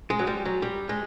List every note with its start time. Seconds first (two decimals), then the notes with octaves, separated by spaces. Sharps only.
0.10 G#3
0.19 F#3
0.27 G3
0.45 F#3
0.62 G3
0.89 G#3